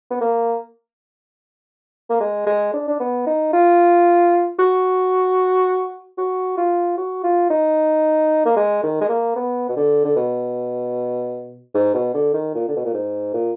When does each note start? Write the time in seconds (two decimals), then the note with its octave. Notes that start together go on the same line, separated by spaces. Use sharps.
0.10 B3
0.21 A#3
2.10 A#3
2.20 G#3
2.46 G#3
2.73 D4
2.88 D4
3.00 B3
3.27 D#4
3.53 F4
4.59 F#4
6.18 F#4
6.57 F4
6.97 F#4
7.24 F4
7.50 D#4
8.45 A#3
8.56 G#3
8.83 D#3
9.01 G#3
9.09 A#3
9.36 B3
9.69 B2
9.76 D3
10.04 D3
10.16 B2
11.74 G#2
11.94 B2
12.14 D3
12.34 D#3
12.55 A#2
12.69 D3
12.76 B2
12.85 A#2
12.94 G#2
13.34 A#2